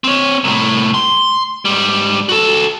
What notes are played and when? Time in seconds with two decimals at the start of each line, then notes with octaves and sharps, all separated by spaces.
0.04 C4 C#5
0.44 C2 A2
0.94 C6
1.65 G#2 G3
2.29 F#4 A4